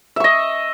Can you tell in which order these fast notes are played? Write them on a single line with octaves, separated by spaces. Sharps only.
E5 C#6 D#5